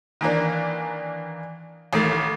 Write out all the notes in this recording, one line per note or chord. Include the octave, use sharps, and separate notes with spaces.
D#3 E3 A#3 D4
A1 D#3 A3 A6